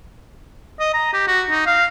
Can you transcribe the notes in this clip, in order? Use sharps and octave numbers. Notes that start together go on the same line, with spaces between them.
D#5
A#5
G4
F#4
D#4
F5